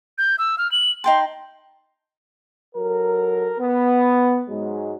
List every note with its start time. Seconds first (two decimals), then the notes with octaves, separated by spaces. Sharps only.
0.18 G6
0.39 E6
0.58 F6
0.72 F#7
1.04 D#4 G5 A5 C6
2.75 F#3 A4 A#4
3.60 B3
4.49 G#2 F#3 G#3